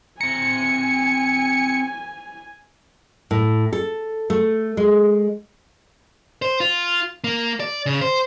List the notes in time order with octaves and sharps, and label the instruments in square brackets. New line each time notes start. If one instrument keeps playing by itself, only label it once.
[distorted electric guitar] C4 A#5 [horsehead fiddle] G#5 [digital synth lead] C#7
[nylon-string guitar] A2
A4
A3
G#3
[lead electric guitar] C5
F4
A#3
D5
C#3
C5